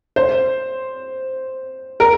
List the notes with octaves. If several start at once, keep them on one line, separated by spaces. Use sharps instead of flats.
C5
A#4